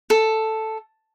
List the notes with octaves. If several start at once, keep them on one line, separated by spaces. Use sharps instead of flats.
A4